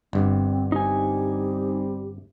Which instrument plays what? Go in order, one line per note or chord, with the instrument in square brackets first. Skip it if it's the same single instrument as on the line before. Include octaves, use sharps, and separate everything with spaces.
[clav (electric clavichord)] G1 G2 [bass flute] C4
[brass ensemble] G3 C4 [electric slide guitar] D#4 G#5 [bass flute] G4